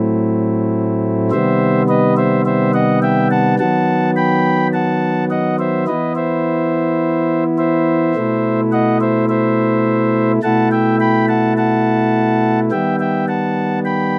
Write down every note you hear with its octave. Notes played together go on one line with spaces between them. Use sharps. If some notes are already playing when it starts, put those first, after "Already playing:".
Already playing: A2 F#3 A3 C4 E4
C3 D#3 G3 B3 C5 E5
B4 D#5
C5 E5
C5 E5
D#5 F#5
E5 G5
F#5 A5
D#3 F#3 B3 F#5 A5
G5 B5
F#5 A5
D#5 F#5
C5 E5
E3 B3 E4 B4 D#5
C5 E5
C5 E5
B2 A3 E4
D#5 F#5
C5 E5
C5 E5
B2 A3 E4 F#5 A5
E5 G5
G5 B5
F#5 A5
F#5 A5
D#3 G3 B3 E5 G5
E5 G5
F#5 A5
G5 B5